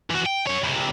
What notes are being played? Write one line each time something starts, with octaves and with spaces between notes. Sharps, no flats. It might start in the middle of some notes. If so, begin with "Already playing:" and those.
E3 F#4
G5
F#2 C#5
C#2 C3